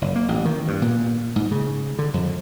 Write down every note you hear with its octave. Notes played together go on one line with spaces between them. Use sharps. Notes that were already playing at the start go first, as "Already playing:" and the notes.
F#1
A#3
A1
D#3
G2
A#2
G#2
C#3
D3
F2